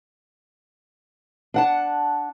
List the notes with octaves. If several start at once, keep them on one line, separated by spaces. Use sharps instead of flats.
D4 F#5 A5